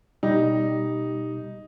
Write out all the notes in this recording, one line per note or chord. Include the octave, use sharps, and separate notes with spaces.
B2 G3 D#4 G4